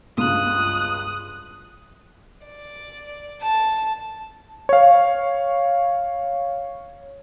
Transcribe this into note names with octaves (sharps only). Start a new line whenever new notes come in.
C#2 G2 F4 D#6 F#6
D5
A5
C#5 F5